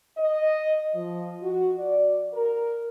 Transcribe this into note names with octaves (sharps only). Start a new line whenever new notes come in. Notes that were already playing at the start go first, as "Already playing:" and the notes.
D#5
F3
F#4
D5
A#4